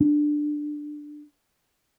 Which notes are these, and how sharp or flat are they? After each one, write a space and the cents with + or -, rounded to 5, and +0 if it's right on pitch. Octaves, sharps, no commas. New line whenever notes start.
D4 +15